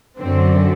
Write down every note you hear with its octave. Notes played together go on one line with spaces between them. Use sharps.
F#2 D3 F#3 C4